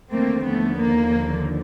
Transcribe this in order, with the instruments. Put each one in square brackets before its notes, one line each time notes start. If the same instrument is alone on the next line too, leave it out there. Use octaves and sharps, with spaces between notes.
[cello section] D#2 D3 F3 A3 A#3 C4
A3 B3
A#3